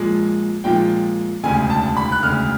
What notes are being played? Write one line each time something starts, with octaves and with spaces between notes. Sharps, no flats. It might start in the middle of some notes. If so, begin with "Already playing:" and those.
Already playing: A#2 F3 G#3
A#2 F3 G#3 G5
E1 D2 C#3 G#5
A5
B5
F#6
E1 D2 C#3 F6